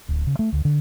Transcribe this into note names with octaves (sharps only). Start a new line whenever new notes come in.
D1
C#3
A3
D2
D3